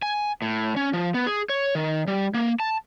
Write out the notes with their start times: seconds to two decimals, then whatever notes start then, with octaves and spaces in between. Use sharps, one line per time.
0.02 G#5
0.42 A2
0.76 C#4
0.93 F3
1.14 B3
1.27 G#4
1.49 C#5
1.75 D#3
2.07 G3
2.34 A#3
2.60 A5